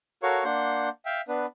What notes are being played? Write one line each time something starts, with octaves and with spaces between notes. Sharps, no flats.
F#4 A4 A#4 C#5 F5 C#6
A#3 D4 F#5 C6 G6
E5 F5 G5
B3 D4 B4